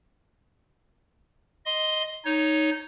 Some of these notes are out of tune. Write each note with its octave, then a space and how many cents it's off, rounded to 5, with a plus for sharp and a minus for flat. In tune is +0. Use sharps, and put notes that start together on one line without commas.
D#5 +0 C6 +0
D#4 +0 C#5 +10